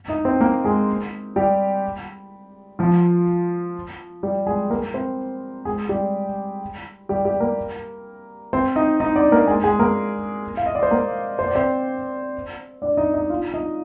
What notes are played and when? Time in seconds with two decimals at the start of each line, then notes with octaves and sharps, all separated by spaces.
0.08 D#4 D#5
0.25 C4 C5
0.40 A#3 A#4
0.64 G#3 G#4
1.36 G3 G4
2.79 F3 F4
4.23 G3 G4
4.47 G#3 G#4
4.70 A#3 A#4
4.94 C4 C5
5.65 G#3 G#4
5.89 G3 G4
7.09 G3 G4
7.25 G3 G4
7.40 A#3 A#4
8.53 C4 C5
8.76 D#4 D#5
9.00 D#4 D#5
9.16 D4 D5
9.32 A#3 A#4
9.47 G#3 G#4
9.63 G#3 G#4
9.79 A#3 A#4
10.57 F5
10.66 D#5
10.75 D5
10.83 C5
10.91 A#3 A#4
11.39 C5
11.48 D5
11.55 C4 C5
12.82 D4 D5
12.97 D#4 D#5
13.14 D#4 D#5
13.30 F4 F5
13.54 D#4 D#5